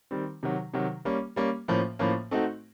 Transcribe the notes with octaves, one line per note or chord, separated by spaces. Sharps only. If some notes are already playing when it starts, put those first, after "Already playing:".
D#3 G3 C4
C3 D#3 F#3
C3 D#3 F#3
G3 A#3 C#4
G3 A#3 C#4
A2 F3 A#3 C#4
A2 F3 A#3 C#4
A3 C4 D#4 F#4